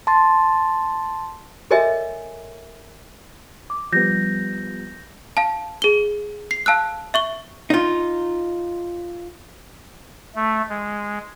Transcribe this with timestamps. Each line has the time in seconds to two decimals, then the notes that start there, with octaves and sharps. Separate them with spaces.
0.07 A5 C6 A6
1.71 A4 A#4 C#5 D#5 E5 G#5
3.70 D6
3.92 F3 G3 B3 G6 A#6
5.37 F5 A5
5.82 G#4 G7
6.51 C7
6.66 F5 A5 E6 F#6
7.14 E5 C#6 G7
7.70 D#4 F4
10.35 A3
10.69 G#3